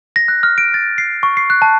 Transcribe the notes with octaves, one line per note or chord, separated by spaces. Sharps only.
A#6
F#6
F6
D7
A6
C7
C#6
C7
F#6
A5